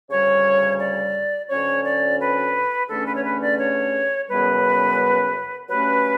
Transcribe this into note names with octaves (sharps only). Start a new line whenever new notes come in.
D2 C#3 G3 C#5
D5
D2 D3 F#3 C#4 C#5
D5
B4
E2 D3 A3 C#4 A4
B4
C#5
B4
D5
C#5
F#2 C#3 E3 G3 B3 B4
G2 F#3 A3 C#4 B4